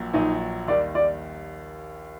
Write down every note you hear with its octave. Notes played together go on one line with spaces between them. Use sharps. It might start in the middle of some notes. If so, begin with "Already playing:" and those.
Already playing: A#1 A#2 F#3
A#1 A#2 F#3 D#4 D#5
D#2 D#3 G3 D5
D5